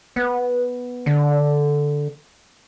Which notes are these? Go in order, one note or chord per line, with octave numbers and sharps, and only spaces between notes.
B3
D3